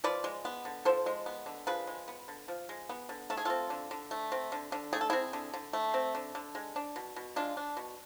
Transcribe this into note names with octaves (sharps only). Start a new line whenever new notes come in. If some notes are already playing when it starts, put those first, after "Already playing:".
F3 B4 D5
G#3
B3
D3
F3 A4 C5
G#3
B3
D3
F3 G#4 B4
G#3
B3
D3
F3
G#3
B3
D3
A3 A4
G#4
C4 F4 A4
D3
D3
A3
C4
D3
D3
A3 G#4
A4
C4 E4 G#4
D3
D3
A3
C4
D3
D3
G#3
D4
B2
B2
G#3 D4 F4
D4
B2